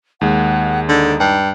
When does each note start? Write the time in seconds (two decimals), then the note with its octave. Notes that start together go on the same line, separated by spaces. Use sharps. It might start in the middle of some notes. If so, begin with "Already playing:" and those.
0.21 D#2 G#3 F#5
0.89 D3 D#4
1.20 G2